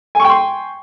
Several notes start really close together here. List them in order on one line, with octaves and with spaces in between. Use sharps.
G#5 C#6 G5 C6